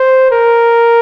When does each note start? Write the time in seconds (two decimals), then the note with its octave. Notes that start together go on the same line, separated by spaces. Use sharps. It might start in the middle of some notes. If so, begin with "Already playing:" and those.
Already playing: C5
0.31 A#4